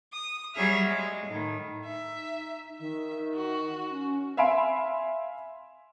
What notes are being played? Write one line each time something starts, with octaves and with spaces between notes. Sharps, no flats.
D#6
F#3 G3 G#4 C#5 E5 F6
G#3
A2 D#3
D#4 E5
D#3 E5
F#4
C#4
E5 F5 G#5 B5 C6 D7